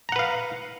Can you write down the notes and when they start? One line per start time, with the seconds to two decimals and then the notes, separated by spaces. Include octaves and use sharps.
0.09 A#5
0.12 F#5
0.16 B4
0.19 F5